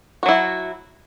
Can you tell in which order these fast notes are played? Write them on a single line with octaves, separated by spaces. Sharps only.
F#4 F#3 E4